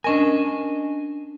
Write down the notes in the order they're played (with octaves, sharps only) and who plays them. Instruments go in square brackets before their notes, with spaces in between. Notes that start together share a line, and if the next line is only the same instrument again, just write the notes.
[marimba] C#4 A#4 [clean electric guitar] D4 D#5 G#5